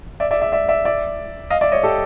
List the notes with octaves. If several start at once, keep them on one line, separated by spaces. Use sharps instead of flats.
D5 E5
D5 E5
D5 E5
D5 E5
D5 E5
D5 E5
D#5 F5
D5 E5
C#5 D#5
G4 A4